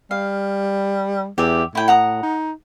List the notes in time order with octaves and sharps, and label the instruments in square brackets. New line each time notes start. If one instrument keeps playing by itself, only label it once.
[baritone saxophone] G3 [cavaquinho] F5
[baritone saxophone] E2 [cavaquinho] G4 E5
[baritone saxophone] A2 [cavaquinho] E4 G5
[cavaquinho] F#5 A#5 D#6
[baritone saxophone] D#4